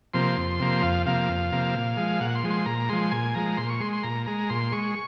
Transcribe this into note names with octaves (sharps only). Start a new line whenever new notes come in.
C3 F3 A#3 C6
F2
C3 F3 A#3
F2 F5
C3 F3 A#3 F5
F2
C3 F3 A#3
A#2
F3 G#3
A#2 F#5
C6
F3 G#3
C6
A#2 A#5
F3 G#3 C6
A#2 G#5
F3 G#3 A#5
A#2 C6
C#6
G#3 C6
C6
A#2 A#5
G#3 A#5
A#2 C6
G#3 C#6